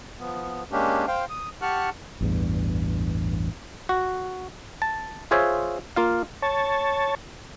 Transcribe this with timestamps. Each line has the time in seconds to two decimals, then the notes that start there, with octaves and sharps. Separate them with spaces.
0.20 F3 B3
0.72 G#3 A#3 C#4 D4 G4
1.07 C5 F5 G5
1.30 D#6
1.62 G4 F#5 A5 C#6 F6 F#6
2.21 A1 E2 G2
3.89 F#4
4.82 A5
5.31 F4 G#4 C5 C#5 E5
5.96 A#3 F4 F5
6.42 C#5 A5